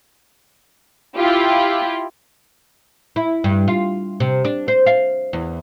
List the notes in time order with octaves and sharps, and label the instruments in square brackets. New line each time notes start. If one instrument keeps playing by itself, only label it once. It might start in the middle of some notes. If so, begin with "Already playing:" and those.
[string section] E4 F4 G4
[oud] E4
G2
F4
C3
D4
C5
F5
E2